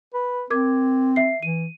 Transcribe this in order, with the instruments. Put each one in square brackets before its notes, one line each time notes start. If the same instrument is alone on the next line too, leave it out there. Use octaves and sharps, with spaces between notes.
[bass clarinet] B4
[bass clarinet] C4 [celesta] A#4 D6 G#6
[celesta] E5 C7
[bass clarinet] E3 [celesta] D#7